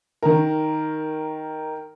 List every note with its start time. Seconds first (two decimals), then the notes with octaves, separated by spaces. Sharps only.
0.22 D#3 A#4